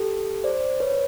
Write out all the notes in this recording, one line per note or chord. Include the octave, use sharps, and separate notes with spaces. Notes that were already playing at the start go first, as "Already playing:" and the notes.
Already playing: G4 A4
C5 D5
B4 C#5